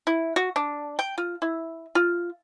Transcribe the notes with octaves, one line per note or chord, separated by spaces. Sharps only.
E4
F#4
D4
G5
F4
E4
F4